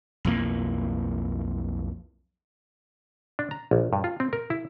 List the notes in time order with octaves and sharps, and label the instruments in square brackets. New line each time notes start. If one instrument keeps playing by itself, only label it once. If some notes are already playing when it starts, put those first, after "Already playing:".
[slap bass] B1 F2 E3 A#3
[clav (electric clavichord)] D4
A#5
A#1
G2
F4
C4
A#4
E4